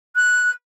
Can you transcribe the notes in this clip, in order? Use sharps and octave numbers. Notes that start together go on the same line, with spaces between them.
F#6